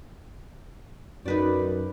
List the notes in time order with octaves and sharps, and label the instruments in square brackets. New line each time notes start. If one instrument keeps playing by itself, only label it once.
[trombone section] F#2 [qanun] D#4 B4 D5